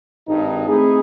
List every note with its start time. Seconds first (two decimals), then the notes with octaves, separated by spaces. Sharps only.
0.28 G#1 G2 D#4
0.68 A3 C4 D#4 E4 G#4